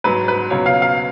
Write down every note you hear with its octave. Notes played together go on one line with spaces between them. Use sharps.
G#2 F#3 B4
B4
C#2 B2 F#3 C#5
F5
F5